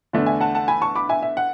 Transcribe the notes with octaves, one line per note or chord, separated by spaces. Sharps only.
E2 D3 A3 D4
E5 G#5
F#5 A5
F#5 A5
G#5 B5
A5 C#6
B5 D6
E5 G#5
E5
F#5